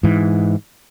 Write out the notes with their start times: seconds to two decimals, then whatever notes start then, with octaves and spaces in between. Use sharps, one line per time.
0.03 G#2 E3